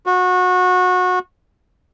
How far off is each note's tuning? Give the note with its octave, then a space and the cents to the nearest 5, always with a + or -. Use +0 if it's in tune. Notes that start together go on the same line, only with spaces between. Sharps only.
F#4 -25